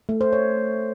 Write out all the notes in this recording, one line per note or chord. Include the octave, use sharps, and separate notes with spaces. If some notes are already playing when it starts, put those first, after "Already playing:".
A3
C5
C#5